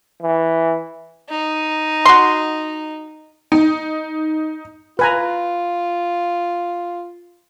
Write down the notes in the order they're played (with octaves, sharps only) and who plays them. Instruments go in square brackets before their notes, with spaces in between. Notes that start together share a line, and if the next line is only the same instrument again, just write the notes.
[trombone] E3
[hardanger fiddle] D#4
[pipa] F#4 C6
[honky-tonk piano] D#4
[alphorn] F4 [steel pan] B4 G#5 A#5